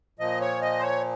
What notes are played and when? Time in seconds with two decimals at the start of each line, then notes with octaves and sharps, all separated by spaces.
0.19 A#2 F3 D#5
0.41 C#5
0.62 D#5
0.79 C5
0.83 C#5